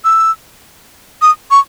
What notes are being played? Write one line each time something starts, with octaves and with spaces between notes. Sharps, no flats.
E6
D#6
C#6